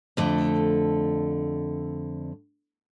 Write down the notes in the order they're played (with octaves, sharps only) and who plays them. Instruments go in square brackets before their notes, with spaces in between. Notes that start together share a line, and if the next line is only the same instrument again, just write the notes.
[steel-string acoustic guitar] F2 D3 A3